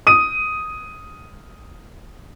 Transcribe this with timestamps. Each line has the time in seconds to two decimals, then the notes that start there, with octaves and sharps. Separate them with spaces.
0.07 D#6 D#7